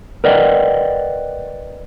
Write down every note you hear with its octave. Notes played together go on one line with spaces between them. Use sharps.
A#4 B4 D5 D#5 F#5 G5